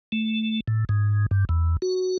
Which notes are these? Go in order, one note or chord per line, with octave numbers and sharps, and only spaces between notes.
A3
A2
G#2
G2
E2
F#4